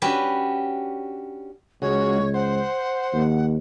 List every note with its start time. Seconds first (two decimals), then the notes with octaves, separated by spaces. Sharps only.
0.02 C#4 D4 F#4 G4 B4
1.82 C#2 C#3 G#3 F#4 C#5
2.34 C5 F#5
3.13 D#2